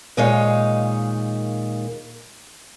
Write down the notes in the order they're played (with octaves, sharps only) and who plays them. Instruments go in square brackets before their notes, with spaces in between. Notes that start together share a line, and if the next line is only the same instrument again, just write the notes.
[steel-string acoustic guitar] D#2 A#2 G#3 D#4 C#5 F5